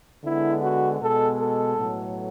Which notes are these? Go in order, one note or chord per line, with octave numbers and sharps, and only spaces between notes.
D3 G#3 B3 E4
F#4
B2 G#3 B3 A4
A4
A2 F#3 B3